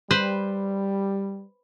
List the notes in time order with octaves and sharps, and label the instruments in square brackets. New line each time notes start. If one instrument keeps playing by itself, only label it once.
[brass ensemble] G3 [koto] B4 C5